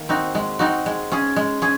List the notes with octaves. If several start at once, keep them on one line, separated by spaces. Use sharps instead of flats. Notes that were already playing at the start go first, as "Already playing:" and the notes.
Already playing: D#3 A#3
C4 D#4 F#4
G#3
C4 D#4 F#4
G#3
C#4 G#4
G#3
C#4 G#4